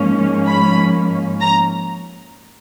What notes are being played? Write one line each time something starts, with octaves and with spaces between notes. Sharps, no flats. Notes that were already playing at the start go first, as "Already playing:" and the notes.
Already playing: G#2 F3 A#3 C#4
B5
A#5